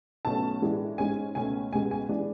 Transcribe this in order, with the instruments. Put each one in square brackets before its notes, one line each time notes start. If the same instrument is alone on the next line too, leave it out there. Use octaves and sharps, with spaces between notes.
[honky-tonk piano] B1 B2 A3 C#4 A5
A2 E3 G#3 D4
G#2 G#3 C#4 G#5
C#2 B2 A3 C#4 G#5
C#2 B2 G#3 G#5
G#5
E3 G#3 D4